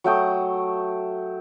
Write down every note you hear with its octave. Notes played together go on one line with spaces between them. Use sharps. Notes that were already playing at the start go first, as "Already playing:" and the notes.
F#3 A3 G5 D#6